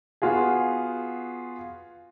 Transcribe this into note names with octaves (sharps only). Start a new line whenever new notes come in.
B3 F4 F#4 G#4